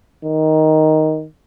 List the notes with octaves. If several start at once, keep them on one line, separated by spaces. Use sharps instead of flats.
D#3